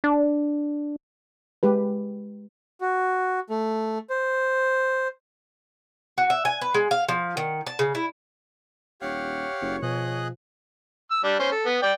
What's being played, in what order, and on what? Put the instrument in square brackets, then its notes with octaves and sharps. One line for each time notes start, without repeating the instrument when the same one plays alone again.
[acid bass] D4
[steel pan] G#3 G4 B4
[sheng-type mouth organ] F#4
A3
C5
[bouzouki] F#4
E5
G#5
B4
G#3
F5
F3
D#3
A5
C#3
E4
[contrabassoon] D#1 [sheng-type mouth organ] G4 F5 F#5 [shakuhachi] C#5
[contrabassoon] F#1
[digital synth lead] B2 [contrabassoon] F3 [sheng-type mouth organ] G#4 D#5 F#6
[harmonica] E6
G3 D4
C#4 C5
A4
B3
D5 G5